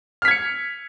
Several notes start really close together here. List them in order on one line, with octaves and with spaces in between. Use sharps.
F6 B6 G#6 C#7